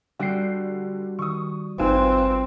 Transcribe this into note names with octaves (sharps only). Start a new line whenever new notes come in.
D3 G3 F#4 G5 C7
D#3 C#6 D#6
G#1 C4 D#4 F4 B4 G#5 E7